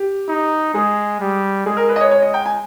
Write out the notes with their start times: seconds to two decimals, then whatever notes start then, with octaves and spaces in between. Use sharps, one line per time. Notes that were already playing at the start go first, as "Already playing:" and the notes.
Already playing: G4
0.29 D#4
0.74 G#3 G#4
1.20 G3
1.66 G#3 G#4
1.77 A#4
1.89 B4
1.96 D#5
2.00 C#5
2.11 C#5
2.22 D#5
2.34 G5
2.46 G#5